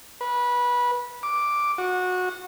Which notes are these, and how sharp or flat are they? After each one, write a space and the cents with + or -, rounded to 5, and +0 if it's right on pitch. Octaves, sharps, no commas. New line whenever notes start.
B4 -20
D6 +0
F#4 -20